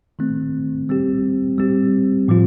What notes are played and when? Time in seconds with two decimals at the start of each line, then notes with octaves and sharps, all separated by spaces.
0.19 D#3 A3 C4
0.89 G3 C4 G4
1.58 G3 C4 G4
2.28 A2 F3 C4 F4